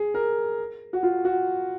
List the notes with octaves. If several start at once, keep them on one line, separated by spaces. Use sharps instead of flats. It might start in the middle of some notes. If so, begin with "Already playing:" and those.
Already playing: G#4
A#4
F#4
F4
F#4